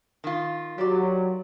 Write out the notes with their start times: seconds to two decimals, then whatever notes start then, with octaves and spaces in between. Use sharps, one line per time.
0.24 D#3 F4
0.78 F#3 G4 C5 D5